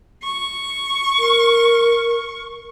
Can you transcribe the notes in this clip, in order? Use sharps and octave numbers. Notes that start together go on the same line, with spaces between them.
C#6
A#4